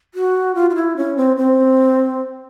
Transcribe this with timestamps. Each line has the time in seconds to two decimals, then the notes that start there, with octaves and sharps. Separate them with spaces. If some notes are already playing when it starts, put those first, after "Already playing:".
0.14 F#4
0.55 F4
0.70 F4
0.75 E4
0.97 C#4
1.17 C4
1.37 C4